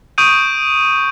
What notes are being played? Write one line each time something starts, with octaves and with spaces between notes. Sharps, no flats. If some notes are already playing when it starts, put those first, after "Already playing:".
C#6 D#6 G6 D7 D#7